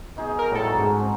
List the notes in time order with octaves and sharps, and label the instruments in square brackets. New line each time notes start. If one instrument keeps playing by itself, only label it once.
[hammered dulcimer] B2 D#4 G#4
[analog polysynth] A#4
[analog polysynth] A2 A4 [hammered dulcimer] G3 G#3 D#4
[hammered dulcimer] F#4 A#4
[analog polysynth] G#2 [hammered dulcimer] C#4 A4
[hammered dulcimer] C4